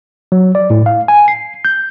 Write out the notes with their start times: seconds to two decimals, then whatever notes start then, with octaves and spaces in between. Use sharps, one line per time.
0.32 F#3
0.55 D5
0.70 A2
0.86 F5
1.08 G#5
1.28 C7
1.65 G6